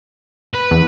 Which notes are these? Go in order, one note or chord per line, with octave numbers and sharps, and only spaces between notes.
B4
E2